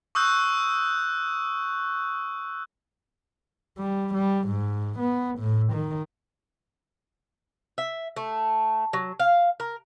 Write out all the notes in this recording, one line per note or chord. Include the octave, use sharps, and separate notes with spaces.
C#6 D#6 E6 F#6 G6
G3
G3
G#2
B3
A2
D#3
E5
A3
F#3
F5
A#4